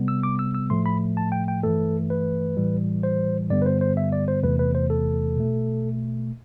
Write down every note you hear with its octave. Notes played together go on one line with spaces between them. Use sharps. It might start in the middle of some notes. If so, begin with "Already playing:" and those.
Already playing: C3 G3 B3
E6
D6
E6
E6
A2 F3 A3 C6
B5
A5
G5
G5
G2 E3 A3 A4
B4
A2 E3 G3
C5
G2 D3 G3 B3 D5
B4
C5
C5
E5
D5
C5
E2 C3 E3 A3 B4
B4
C5
A4
B2 A3